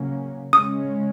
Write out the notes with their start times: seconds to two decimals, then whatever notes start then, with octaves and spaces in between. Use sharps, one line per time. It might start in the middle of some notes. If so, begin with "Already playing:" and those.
Already playing: C#3 F#3 A#3 C#4
0.52 C#3 G#3 C#4 D#6